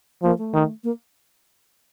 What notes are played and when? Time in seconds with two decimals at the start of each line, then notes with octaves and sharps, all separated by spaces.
0.23 F3 A#3
0.38 A3
0.54 D#3
0.84 A#3